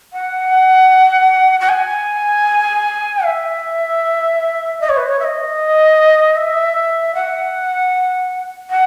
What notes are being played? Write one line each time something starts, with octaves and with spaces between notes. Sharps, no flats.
F#5
F#5
G#5
E5
D#5
C#5
B4
C#5
E5
D#5
E5
F#5
F#5